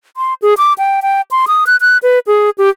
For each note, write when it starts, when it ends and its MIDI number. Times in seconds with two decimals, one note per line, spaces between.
0.17 0.34 84
0.42 0.54 68
0.58 0.73 86
0.78 1.00 79
1.02 1.21 79
1.31 1.46 84
1.48 1.64 87
1.67 1.76 90
1.81 1.98 90
2.03 2.19 71
2.27 2.50 68
2.58 2.69 67